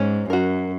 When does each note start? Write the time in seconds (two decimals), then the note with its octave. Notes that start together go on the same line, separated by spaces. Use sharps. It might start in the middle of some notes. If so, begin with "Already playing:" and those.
Already playing: G#2 C#4
0.30 F#2 F#4 A#4